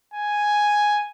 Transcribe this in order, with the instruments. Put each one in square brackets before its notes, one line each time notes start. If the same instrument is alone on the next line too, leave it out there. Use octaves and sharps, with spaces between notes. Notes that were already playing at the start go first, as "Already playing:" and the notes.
[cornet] G#5